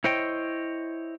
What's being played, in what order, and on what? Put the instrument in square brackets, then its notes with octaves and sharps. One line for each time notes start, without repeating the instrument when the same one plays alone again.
[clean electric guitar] E4 C5 C#5 D#5 G5